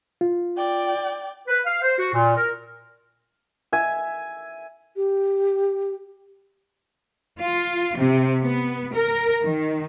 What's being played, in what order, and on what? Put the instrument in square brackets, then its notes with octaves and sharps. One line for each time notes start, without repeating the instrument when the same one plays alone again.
[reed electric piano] F4
[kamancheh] D5 G5
[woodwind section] B4
F5
C5
F#4
A#2
A#4
[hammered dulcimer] E5 G#5
[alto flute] G4
[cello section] F4
C3
B3
A#4
D#3